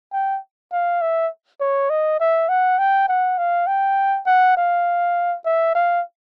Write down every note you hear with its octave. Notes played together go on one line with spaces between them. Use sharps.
G5
F5
E5
C#5
D#5
E5
F#5
G5
F#5
F5
G5
F#5
F5
E5
F5